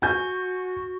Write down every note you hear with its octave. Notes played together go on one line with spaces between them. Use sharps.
F#4 G#5 G6